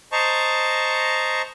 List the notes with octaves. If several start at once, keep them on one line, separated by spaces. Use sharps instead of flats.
C5 D#5 A5 A#5 C#6